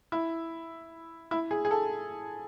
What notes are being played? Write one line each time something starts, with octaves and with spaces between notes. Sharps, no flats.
E4
E4
G#4
G#4
A4